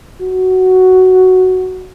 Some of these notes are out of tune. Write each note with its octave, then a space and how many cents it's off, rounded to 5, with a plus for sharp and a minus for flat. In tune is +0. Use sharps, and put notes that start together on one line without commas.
F#4 +5